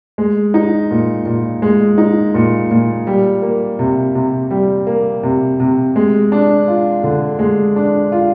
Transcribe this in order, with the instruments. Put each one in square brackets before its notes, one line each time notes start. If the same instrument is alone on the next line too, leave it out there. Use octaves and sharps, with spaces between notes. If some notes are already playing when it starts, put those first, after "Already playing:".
[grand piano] G#3
D#4
A#2
A#2
G#3
D#4
A#2
A#2
G3
A#3
C3
C3
G3
A#3
C3
C3
G#3
D4
F4
D3
G#3
D4
F4